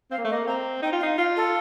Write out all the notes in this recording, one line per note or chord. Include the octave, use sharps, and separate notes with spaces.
C4 F5
A#3
A3
D#5
A#3
C4 A#5
D#4 G5
F4
F5
D#4
F4 F5
A4